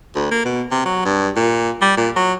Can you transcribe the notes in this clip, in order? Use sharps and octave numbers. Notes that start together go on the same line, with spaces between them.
D2
A#3
B2
C3
F#3
G2
A#2
G3
A#2
F#3